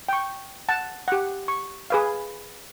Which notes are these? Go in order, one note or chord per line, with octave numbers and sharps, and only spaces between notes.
G5 C#6
F#5 A5
G4 F#5
C#6
G#4 B4 F5